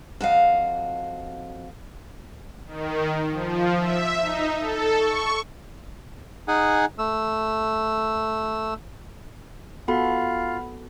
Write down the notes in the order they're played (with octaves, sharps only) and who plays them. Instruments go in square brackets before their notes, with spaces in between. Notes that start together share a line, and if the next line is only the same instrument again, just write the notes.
[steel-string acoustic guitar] F2 F#4 D#5 F5
[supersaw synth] D#3
F3
E5
D#4
A4
C#6
[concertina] D#4 G#4 F#5 G#5
A3 E6
[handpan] B3 F#4 A4 [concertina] F4 F5 [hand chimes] F#5 B5